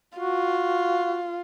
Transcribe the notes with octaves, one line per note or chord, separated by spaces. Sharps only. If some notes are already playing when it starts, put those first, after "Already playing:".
F4 F#4